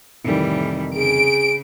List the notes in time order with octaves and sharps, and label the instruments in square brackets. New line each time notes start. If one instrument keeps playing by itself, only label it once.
[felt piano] F1 D#3 [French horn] A2 [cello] E3 G3
[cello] C#3 [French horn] G#4 [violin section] D7